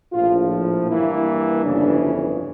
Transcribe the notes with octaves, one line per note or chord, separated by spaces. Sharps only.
A#1 A2 F3 F4
G2 E3 A#3 E4
G1 F2 C#3 E3 D4